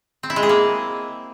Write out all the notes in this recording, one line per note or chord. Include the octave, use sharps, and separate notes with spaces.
C4
E4
G#3
G#4
A#3